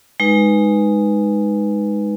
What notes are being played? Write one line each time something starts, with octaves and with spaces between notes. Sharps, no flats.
G#3 D#4 B4